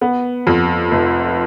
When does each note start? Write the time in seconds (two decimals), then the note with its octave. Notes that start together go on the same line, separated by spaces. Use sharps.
0.01 B3
0.47 F2
0.91 F1